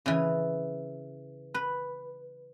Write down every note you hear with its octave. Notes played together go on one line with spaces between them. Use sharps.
C#3 E3
B4